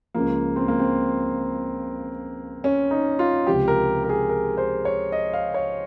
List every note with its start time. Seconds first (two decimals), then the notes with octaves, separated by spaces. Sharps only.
0.14 C#2 C#3 F3 A#3
0.56 C4
0.68 A#3
0.79 C4
2.64 C#4
2.91 D#4
3.19 F4
3.47 C#2 C3 F3 G4
3.68 A#4
4.04 A#4
4.09 G#4
4.29 A#4
4.58 C5
4.85 C#5
5.12 D#5
5.33 F5
5.54 C#5